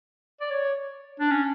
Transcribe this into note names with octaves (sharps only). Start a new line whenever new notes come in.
D5
C#5
D4
C#4